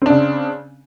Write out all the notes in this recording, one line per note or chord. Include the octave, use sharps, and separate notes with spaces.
C#3 C4 D4